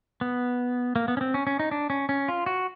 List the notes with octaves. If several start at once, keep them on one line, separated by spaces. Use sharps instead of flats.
B3
A#3
B3
C#4
C4
C#4
C#4
D#4
D4
C#4
C#4
F4
F#4